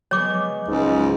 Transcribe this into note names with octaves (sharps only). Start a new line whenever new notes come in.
F#3 G#3 B3 C#5 D6
C#2 G#2